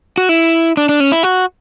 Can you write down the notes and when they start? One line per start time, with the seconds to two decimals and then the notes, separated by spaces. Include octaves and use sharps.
0.18 F#4
0.29 E4
0.77 D4
0.89 D4
1.00 C#4
1.12 E4
1.23 F#4